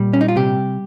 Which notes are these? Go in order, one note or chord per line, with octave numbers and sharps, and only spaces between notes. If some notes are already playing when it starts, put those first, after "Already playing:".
Already playing: A#2 G3
C#4
D#4
F4
C3 G4